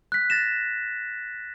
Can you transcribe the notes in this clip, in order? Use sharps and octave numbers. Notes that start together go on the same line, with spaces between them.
F#6 B6
A6 A#6 E7